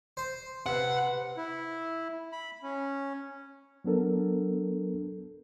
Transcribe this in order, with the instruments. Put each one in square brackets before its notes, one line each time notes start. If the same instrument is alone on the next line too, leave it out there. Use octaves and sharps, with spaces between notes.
[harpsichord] C5
[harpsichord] C3 [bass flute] B4 [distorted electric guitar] F#5
[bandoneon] E4
B5
C#4
[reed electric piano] F#3 B3 D4 A4 A#4